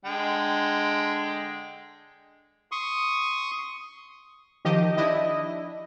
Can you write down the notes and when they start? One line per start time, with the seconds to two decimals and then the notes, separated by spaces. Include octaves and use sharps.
0.05 D3 G#3 G5
2.72 C6 C#6 D#6
4.65 D#3 F3 G4 D#5
4.97 D4 E4 D#5